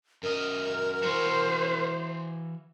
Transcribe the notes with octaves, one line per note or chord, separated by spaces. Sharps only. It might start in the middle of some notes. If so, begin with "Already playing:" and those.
F#2 A#4 D#5
E3 F#4 C5